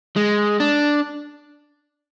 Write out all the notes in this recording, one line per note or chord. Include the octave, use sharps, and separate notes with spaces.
G#3
D4